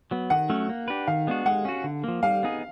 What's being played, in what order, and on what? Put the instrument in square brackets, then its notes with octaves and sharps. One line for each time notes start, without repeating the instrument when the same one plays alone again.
[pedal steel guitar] F#3 B3
[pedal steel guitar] D#3 [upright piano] F#5
[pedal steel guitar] F#3 A3 C#4
A#3
D4 G4 B4
[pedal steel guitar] D#3 [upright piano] F5
[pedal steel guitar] G#3 B3 D4 F#4
[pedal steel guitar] G#3 [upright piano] F#5
[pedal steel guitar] C#4 F#4
D3
F3 A#3
[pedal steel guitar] G3 [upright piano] F5
[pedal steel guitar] B3 D#4 G#4